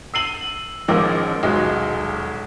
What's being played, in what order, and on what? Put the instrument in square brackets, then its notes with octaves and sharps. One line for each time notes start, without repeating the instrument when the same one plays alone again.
[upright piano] E6 C7 D#7 F#7
A1 D#3 F3 G#3 D6 E6
D#1 B1 G#3 F#4